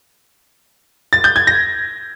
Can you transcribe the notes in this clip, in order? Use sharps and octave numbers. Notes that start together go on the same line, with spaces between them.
A6
G6
G#6
A#6